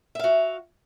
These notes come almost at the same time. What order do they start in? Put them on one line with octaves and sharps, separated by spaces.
E5 F5 F#4